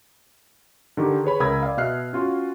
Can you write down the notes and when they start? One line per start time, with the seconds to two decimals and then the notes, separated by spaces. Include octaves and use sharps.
0.97 D3 D#3 G4
1.24 G#4 B4 C#5 B5
1.40 C#2 A#4 B5 D#6 E6 G#6
1.63 D5 F5
1.77 B2 D#5 E5 F6 F#6 C7
2.13 C#4 F4 F#4